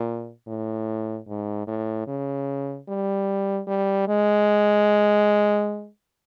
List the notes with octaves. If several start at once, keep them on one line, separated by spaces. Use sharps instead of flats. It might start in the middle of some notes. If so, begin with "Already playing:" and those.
Already playing: A#2
A2
G#2
A2
C#3
G3
G3
G#3